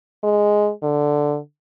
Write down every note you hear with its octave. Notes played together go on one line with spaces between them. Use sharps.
G#3
D3